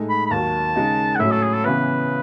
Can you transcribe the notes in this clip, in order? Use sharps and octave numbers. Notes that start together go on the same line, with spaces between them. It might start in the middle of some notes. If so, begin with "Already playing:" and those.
Already playing: A2 G#3 D#4 A4
B5
B5
D#2 D#3 F#3 A5
C#3 G#3 D#4
F#5
A2 F#3 C#4 E5
A4
G#4
A4
C#3 E3 B3 B4